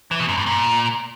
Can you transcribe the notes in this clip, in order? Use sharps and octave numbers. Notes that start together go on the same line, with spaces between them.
E3
B2
F#2
G2
A#2